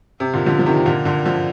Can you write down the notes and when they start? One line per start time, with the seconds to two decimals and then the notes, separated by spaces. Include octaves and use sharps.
0.20 C3
0.33 A#2 D3
0.46 D3 F3
0.59 F3
0.66 C3 D#3
0.86 A#2 D3
1.05 A#2 D3
1.25 D3 F3